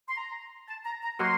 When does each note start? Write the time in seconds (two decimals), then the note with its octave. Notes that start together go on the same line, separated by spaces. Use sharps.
0.09 C6
0.17 A#5
0.69 A5
0.85 A#5
1.03 A#5
1.19 F#3 A#3 F#4 A#4 D#5 C6